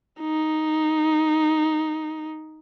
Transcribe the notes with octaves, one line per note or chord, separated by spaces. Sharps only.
D#4